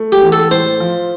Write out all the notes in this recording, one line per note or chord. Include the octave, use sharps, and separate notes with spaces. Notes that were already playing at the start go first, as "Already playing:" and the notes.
Already playing: A3
G4
E2
A4
A2 C5
F3